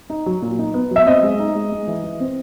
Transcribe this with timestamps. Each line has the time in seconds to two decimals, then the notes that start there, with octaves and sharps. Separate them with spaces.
0.10 D#4
0.26 F#3
0.42 A#2
0.59 D#4
0.74 B3
0.91 F#3
0.96 E5
1.06 C4 D#5
1.23 G#3
1.39 D#4
1.55 G#3
1.72 G#3
1.87 E3
2.03 E3
2.20 C4